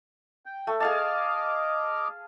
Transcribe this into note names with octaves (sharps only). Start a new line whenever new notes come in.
G5
A3
G#4 D#5 F5 A5 D6 F6